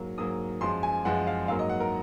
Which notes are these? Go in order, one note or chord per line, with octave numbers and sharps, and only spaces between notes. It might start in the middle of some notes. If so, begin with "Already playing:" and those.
Already playing: G#2 F#3 A#3
G#2 F#3 A#3 D#6
F#2 F3 G#3 C6
G#5
F#2 F3 G#3 F#5
F5
G#2 F#3 A#3 F5
D#5
F#5
A#4